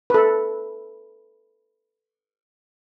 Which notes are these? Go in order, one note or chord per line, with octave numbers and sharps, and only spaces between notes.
A4 B4